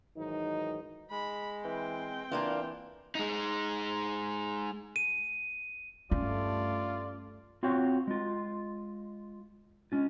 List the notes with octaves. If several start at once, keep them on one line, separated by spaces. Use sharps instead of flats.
G#2 D#3 E3 F#3 D#4
G#3 B5
E3 C4 G5
E3 A#3 D4 F4
G#3 D#4
D#7
G2 A3 C#4 F4 D5
C4 F4 F#4 C#5 G5
G#3 F4
G#3 C#4 F4